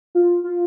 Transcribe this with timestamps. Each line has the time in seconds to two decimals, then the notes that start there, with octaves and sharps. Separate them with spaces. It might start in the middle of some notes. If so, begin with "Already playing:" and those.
0.15 F4
0.44 F4